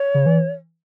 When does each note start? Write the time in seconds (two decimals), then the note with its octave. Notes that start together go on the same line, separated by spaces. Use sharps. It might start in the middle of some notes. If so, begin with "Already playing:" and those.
Already playing: C#5
0.14 C#3
0.26 E3